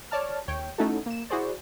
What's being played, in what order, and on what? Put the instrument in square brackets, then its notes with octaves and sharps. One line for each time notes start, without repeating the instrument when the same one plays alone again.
[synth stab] C#5 D5 A5 F6
D#2 C#5 G5
A3 C#4 D#4 E4 F#4 A4
A#3 E7
E4 F#4 G#4 C5 D5